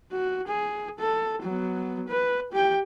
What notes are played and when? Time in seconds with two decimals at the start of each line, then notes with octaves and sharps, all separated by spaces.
0.12 F#4
0.47 G#4
0.99 A4
1.42 F#3 B3
2.08 B4
2.52 G4 G5